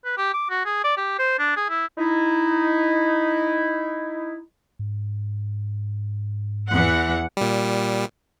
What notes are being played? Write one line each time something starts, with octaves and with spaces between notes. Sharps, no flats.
B4
G4
D6
F#4
G#4
D5
G4
C5
D4
G#4
E4
D#4 E4
G#2
E2 E3 F#5
A#2 G3